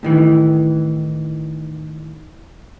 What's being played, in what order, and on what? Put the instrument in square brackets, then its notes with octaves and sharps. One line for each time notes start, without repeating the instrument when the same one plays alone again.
[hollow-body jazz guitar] A2 D#3 E3